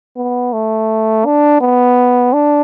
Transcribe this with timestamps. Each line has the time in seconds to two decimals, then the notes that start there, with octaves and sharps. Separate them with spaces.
0.17 B3
0.53 A3
1.26 D4
1.61 B3
2.33 D4